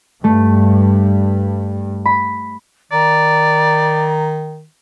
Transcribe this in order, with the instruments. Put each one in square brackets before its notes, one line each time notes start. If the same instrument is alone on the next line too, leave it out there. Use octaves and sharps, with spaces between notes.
[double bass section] G2 [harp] A3
[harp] B5
[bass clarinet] D#3 [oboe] D5 [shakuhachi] A#5